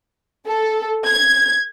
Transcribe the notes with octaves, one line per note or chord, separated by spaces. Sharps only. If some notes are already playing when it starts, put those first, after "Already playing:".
A4
G#6